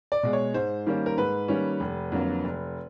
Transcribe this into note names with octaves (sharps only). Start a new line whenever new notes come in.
D5
B2 G#3
C#5
G#2 C5
D#3 G3 A#3 C#4
A#4
G#2 B4
D#3 G3 A#3 C#4
F1
F2 D3 F#3 A#3
F1